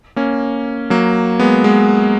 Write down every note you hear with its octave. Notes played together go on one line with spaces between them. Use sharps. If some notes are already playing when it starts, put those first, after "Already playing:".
A#3 C#4
F#3 A#3
G#3 B3
G#3 B3